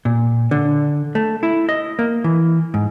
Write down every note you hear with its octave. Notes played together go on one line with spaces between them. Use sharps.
A#2
D3
A3
E4
D#5
A#3
E3
G#2